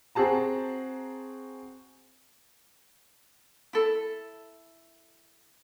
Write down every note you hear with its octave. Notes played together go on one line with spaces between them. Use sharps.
C4 F#4 G#4 A5 A#5
E4 A4